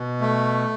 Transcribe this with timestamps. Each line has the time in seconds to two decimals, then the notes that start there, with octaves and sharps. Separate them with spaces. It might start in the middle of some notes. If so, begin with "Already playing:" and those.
Already playing: B2
0.21 A3